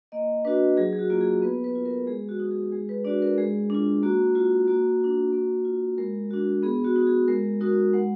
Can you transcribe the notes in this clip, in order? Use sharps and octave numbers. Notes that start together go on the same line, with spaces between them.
A#3 D#5
D4 F#4 B4
F#3 G#4
G#4
F#4
A#3 F4
G#4
B3 B4
B4
F4
A#4
G#3 G#4
F#4
D#4 F#4
G#4
G#3 G#4
B4
D4 F#4 D5
A#4
G#3 G#4
D4 F4
A#3 F#4
F4 F#4
A#3 F#4
D4 F4
A#3
F4
G#3 A#4
D4 F#4
B3 G#4
F#4
D#4 F#4
G#4
G#3 A#4
D#4 F#4 A#4
G#3 F#5